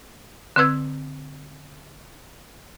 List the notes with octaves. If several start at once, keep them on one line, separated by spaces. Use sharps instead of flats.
D3 C4 B4 E6 G#6